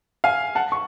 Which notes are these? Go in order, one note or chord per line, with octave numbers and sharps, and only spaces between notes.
F5 G#5
F#5 A5
C#6